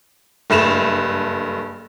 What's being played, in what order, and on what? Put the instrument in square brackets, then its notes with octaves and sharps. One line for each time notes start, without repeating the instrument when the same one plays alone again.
[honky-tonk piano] F#1 G2 A3 E7 F7